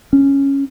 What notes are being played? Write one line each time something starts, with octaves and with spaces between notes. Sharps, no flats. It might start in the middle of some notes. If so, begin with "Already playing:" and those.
C#4